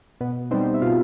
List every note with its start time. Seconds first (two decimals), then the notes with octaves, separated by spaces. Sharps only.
0.21 B2 B3 B4
0.51 G3 B3 C4 D#4 C5
0.74 E5
0.82 B2 F4 F5